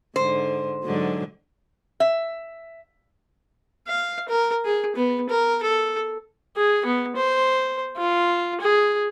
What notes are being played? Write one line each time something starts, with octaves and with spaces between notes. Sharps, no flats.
G#2 D3 C5
G#2 D3 F#3
E5
F5
A#4
G#4
B3
A#4
A4
G#4
B3
C5
F4
G#4